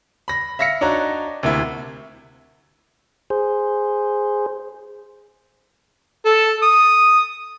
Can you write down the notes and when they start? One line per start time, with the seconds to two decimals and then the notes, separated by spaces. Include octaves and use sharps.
0.28 B5 A#6
0.59 E5 F5 A#6 B6 C#7
0.81 D4 D#4 F#4 C#5 A#5
1.43 D2 C3 A#3 E4
3.30 G#4 C5
6.25 A4
6.63 D#6